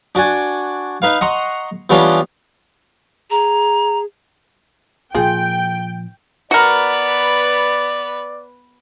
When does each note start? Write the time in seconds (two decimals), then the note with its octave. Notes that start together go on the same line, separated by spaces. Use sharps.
0.15 D4 F#4 D5 G#5
1.02 D#4 B4 F5
1.21 D#5 F#5 A#5 C6 C#6 D#6
1.90 E3 G3 B3 C#4 D4 F4
3.30 G#4 A#5
5.15 A#2 F3 F4 G#4 G5
6.51 B3 F#4 A#4 B4 D5